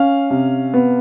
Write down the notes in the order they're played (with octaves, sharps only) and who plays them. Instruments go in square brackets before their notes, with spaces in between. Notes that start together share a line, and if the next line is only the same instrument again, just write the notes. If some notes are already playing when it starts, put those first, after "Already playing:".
Already playing: [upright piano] C#4 F5
C3
B3